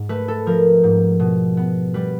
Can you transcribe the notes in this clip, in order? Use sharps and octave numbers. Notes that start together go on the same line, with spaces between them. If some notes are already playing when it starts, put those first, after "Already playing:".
Already playing: G#2
A3 B4
A4
F3 A#4
G#2
B2
B3
G3 B4